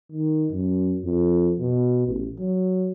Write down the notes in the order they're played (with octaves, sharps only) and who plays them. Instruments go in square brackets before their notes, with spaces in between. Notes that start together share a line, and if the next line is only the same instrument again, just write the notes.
[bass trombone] D#3
F#2
F2
B2
A1
F#3